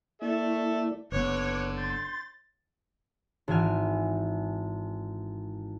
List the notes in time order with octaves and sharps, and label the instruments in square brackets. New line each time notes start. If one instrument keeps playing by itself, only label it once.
[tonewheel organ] A#3 E4 D5 [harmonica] A4 E5
[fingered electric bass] F#1 B3 [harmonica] D3 [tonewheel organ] B4 D6 F#6 [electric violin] C#5
[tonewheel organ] C6 G6 [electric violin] A6
[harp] G#1 E3 E5 G#5 F6